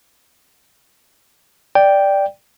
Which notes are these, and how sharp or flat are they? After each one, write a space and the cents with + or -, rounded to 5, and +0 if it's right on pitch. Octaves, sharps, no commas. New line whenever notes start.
D5 +0 G5 +0